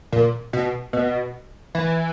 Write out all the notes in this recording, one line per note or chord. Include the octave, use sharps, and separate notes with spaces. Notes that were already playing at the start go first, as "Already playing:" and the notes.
A#2
B2
B2
E3